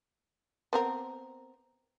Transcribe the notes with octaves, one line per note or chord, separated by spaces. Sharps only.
B3 C4 A#4